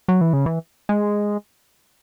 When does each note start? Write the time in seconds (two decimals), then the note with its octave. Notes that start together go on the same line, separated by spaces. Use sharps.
0.08 F#3
0.21 E3
0.33 C#3
0.46 E3
0.89 G#3